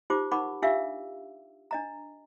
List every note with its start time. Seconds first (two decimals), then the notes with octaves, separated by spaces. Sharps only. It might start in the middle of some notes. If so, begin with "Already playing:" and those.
0.10 D#4 F4 G4 C5 D6
0.31 D#4 A#4 F#5 B5 C#6 D6
0.62 D4 F4 G4 E5 F5 E6
1.71 D4 D#5 A#5